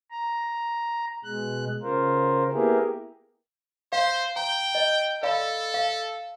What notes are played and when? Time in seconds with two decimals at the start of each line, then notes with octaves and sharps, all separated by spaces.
0.11 A#5
1.24 B2 G#3 F#6
1.83 C#3 F4 A#4 C5
2.52 A#3 B3 E4 G4 G#4 A#4
3.93 C5 F5
4.36 G5 A#5
4.75 D#5
5.23 A4 D5 F5 B5
5.74 F5